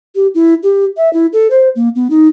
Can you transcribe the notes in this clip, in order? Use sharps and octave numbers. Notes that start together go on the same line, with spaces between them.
G4
E4
G4
E5
E4
A4
C5
A#3
B3
D#4